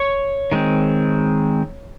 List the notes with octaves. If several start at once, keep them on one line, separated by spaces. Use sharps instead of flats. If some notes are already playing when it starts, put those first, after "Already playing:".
Already playing: C#5 C#6
D#3 G#3 C4